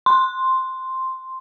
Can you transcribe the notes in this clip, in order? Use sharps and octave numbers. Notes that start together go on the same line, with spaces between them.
C6